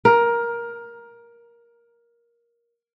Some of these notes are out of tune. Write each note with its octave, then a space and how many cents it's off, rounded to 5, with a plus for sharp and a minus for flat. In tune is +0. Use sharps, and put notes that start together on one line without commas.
A#4 +15